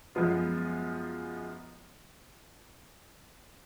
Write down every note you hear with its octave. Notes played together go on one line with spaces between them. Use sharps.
F#2 F3 G#3 B3 F4